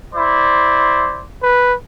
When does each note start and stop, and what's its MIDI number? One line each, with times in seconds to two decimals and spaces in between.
0.15 1.23 64
0.15 1.23 72
0.15 1.23 74
1.43 1.74 71